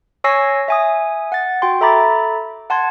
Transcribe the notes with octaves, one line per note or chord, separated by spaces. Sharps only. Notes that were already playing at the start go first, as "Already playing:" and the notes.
C#5 G#5 C#6 E6 A#6 C7
E5 G#5 D#6
F#5 A6
F#4 G5 C6
A4 E5 A#5 B5 D6 A6
F#5 A5 C6 G#6